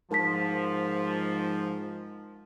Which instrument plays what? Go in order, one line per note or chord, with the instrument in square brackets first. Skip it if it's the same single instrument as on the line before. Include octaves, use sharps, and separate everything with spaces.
[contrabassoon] G#2 [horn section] F3 [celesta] A#4 A5 B6